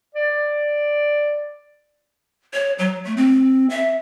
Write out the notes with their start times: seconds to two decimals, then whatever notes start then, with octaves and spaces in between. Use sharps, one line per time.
0.15 D5
2.53 C#5
2.79 F#3
3.04 A3
3.17 C4
3.70 E5